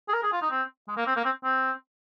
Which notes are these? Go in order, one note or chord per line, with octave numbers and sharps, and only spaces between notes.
G#4
A#4
G#4
F4
D#4
C4
G#3
A#3
C4
A#3
C4
C4